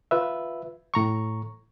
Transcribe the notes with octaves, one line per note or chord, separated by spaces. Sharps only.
F4 B4 E5
A2 A#5 C#6